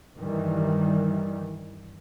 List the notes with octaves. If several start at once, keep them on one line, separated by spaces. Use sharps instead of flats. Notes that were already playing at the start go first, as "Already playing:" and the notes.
G2 D#3 E3 G3